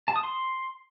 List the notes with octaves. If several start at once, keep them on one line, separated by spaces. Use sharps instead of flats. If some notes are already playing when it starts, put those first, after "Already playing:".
A5
D#6
C6